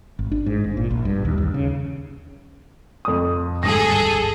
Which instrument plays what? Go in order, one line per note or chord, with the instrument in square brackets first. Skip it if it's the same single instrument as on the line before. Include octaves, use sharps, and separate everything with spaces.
[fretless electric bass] G#1
D4
G#2
G#1
A#2
A#1
G2
D#2
D#2
C#3
[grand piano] F2 D#6
[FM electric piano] G#1 D2 G2 [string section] G#4 A4 [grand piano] D#6 A#6